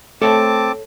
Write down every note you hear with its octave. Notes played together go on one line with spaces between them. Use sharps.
A3 C4 A4 C#5 E5 A5 D6